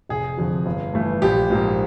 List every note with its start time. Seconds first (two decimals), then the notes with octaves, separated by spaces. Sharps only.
0.09 F1 G#4
0.37 F2 D3 F3
0.66 G1
0.94 G2 E3 A3
1.22 A#1 G4
1.50 G#2 F3 A#3